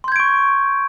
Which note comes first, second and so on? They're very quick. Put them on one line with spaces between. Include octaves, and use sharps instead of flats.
C6 G6 G#6 D7 C#6